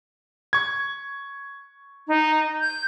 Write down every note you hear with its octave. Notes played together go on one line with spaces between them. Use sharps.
C#6 G#6
D#4
G6